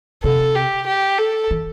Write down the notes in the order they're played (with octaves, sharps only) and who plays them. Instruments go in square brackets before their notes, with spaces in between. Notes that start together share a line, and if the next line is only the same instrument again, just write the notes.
[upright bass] C3 [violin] A4
[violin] G4
G4
A4
[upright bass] E3